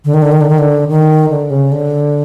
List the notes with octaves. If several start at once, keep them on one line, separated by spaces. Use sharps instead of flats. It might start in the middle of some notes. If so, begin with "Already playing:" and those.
D3
D#3
D3
D#3
D3
D#3
D3
D#3
D3
C#3
D3